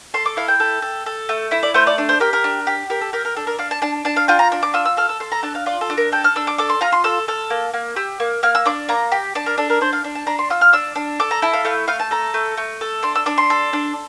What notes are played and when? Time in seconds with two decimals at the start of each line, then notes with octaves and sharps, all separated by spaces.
0.14 A4 C6
0.26 D6
0.37 E4 F5
0.48 G5
0.60 A4
0.82 A4
1.06 A4
1.29 A3
1.51 E4 E5
1.63 D5
1.74 A3 C5
1.87 D5
1.98 D4
2.09 C5
2.20 G4 A#4
2.33 A#4
2.44 D4
2.67 G4
2.90 G4 A#4
3.01 A4
3.13 G4 A#4
3.25 A#4
3.37 D4 A4
3.47 A#4
3.59 D4 F5
3.71 A5
3.82 D4 A5
4.05 D4 A5
4.16 F5
4.28 F4 G5
4.39 A#5
4.52 D4
4.62 D6
4.74 F4 E6
4.85 E6
4.97 A4 F6
5.09 E6
5.20 A4 C6
5.32 A#5
5.43 D4 A5
5.55 F5
5.66 F4 D5
5.81 A4
5.90 D4
5.98 A#4
6.12 A4 G5
6.24 F6
6.36 D4 E6
6.47 D6
6.58 A4 D6
6.69 C6
6.81 F4 A#5
6.92 C6
7.04 A4 E6
7.28 A4 F6
7.50 A#3
7.74 A#3
7.96 G4 E6
8.20 A#3
8.43 A#3 F6
8.55 E6
8.66 D4 D6
8.89 A#3 A#5
9.12 G4
9.35 D4 A5
9.46 A#4
9.58 D4 A4
9.70 A#4
9.81 D4 C5
9.93 F5
10.04 D4
10.15 A5
10.27 D4 A#5
10.39 C6
10.50 F4 E6
10.61 F6
10.73 D4 E6
10.96 D4
11.20 A4 D6
11.31 A#5
11.42 E4 A5
11.53 F5
11.65 A3 F5
11.88 A3 F5
12.00 A5
12.11 A4 A#5
12.34 A3
12.57 A3
12.81 A4
13.03 D4 C6
13.15 E6
13.26 D4 D6
13.38 C6
13.50 A4
13.73 D4